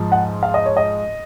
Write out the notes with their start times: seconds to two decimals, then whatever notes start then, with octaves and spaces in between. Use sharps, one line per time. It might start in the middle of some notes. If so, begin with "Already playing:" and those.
Already playing: G#2 F3 G#3
0.12 F#5
0.43 F5
0.54 D#5
0.66 C#5
0.77 D#5